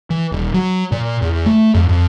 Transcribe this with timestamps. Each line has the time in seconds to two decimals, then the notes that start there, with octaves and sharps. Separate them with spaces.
0.10 E3
0.32 D#1
0.54 F#3
0.92 A#2
1.22 E2
1.46 A3
1.75 F2
1.89 F2